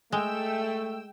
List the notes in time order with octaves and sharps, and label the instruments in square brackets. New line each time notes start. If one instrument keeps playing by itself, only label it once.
[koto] G#3 [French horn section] A3 [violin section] G5 E6